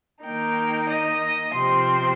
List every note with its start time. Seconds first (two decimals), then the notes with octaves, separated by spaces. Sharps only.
0.24 D#3 A#3 D#4 G5
0.89 D#5
1.54 C3 F3 C4 C6